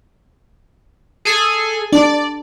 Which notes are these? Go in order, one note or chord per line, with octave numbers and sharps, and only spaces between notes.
G#4 A4 G#5
D4 D5